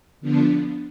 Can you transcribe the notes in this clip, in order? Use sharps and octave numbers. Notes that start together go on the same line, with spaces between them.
D3 F3 B3 D4